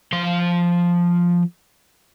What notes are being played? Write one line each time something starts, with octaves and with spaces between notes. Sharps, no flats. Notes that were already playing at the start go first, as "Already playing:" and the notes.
F3 C6